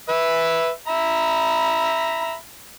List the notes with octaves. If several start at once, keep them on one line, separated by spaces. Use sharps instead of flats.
B4 E5
E5 A#5 B5